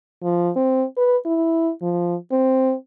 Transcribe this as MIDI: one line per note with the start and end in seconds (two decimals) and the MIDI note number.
0.23 0.50 53
0.56 0.85 60
0.97 1.17 71
1.26 1.71 64
1.82 2.15 53
2.32 2.74 60